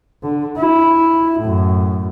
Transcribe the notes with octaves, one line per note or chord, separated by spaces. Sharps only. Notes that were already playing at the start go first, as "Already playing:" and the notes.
D3
E4
F#2 A2